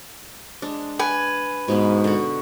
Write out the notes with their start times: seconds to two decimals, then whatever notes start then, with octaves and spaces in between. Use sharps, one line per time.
0.62 G#3 D4
0.99 B4 G#5
1.68 G#2 B2 G#3 B3
2.04 D3 F#4